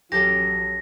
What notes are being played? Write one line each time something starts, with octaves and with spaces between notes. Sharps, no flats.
A1 F#3 C#4 G4 A4 A#6